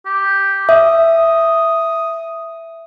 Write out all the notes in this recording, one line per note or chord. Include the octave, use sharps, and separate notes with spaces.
G4
E5 D#6